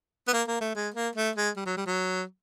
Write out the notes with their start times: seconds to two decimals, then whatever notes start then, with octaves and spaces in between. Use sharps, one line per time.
0.28 B3
0.33 A#3
0.48 A#3
0.61 A3
0.75 G#3
0.94 A#3
1.16 A3
1.36 G#3
1.57 G3
1.66 F#3
1.77 G3
1.86 F#3